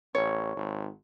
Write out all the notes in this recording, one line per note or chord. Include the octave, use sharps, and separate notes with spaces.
A1 C#5
G#1